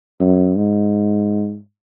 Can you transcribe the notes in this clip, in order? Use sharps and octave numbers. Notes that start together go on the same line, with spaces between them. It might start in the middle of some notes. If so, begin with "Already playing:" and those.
F#2
G#2